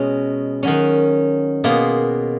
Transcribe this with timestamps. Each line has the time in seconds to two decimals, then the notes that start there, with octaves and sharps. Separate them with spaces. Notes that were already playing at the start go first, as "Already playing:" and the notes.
Already playing: B2 G#3 C#4 G#4
0.63 D#3 F#3 C#4
1.64 B2 A#3 F4 G#4